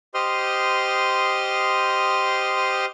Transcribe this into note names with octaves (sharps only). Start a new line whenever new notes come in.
G4 C5 D#5 C6 D#6 F6